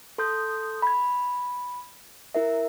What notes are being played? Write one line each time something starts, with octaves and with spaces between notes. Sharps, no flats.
A4 C6 D#6 G6
B5 G#6
E4 A#4 E5